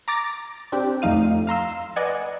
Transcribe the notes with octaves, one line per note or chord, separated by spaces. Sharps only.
A#5 D6 A6 A#6
C4 D4 G4
F2 F3 A3 D#4 F5 D#7
F5 A#5 C6 E6
B4 D5 D#5 F#5 G#5